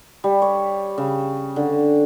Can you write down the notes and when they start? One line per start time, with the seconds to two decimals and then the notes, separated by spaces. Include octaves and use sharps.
0.24 G3
0.42 C#5
0.98 C#3
1.56 D3